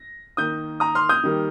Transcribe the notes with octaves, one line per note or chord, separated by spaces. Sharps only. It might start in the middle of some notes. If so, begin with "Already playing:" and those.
Already playing: A#6
D#3 A#3 D#6 G6
A#5 D#6
C6 F6
D#6 G6
D#3 G3 A#3